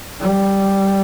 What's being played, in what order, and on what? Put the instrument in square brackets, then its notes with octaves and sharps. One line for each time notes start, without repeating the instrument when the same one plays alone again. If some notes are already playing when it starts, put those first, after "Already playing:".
[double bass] G3